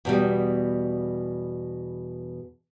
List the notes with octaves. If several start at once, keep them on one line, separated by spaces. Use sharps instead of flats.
E2 B2 G3